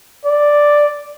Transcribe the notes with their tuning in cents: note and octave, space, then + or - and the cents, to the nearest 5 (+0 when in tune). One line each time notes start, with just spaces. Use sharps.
D5 +0